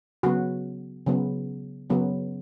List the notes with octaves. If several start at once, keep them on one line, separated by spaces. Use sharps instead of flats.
C#3 F#3 B3 F#4
C#3 F#3 B3
C#3 F#3 B3